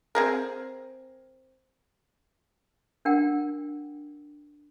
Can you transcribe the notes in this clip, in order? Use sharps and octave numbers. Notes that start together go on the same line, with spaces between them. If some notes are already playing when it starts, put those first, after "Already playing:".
C4 G#4 A#4
D4 A#4 F#5 G5